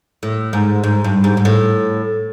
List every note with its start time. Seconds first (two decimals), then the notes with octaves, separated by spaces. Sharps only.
0.23 A2
0.53 G#2
0.84 G#2
1.04 G2
1.24 G#2
1.37 G#2
1.45 A2